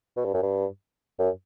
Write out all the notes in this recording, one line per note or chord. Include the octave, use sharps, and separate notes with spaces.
B2
G2
F#2
G2
F#2